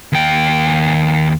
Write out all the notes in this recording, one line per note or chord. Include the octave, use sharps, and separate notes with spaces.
D#2 G5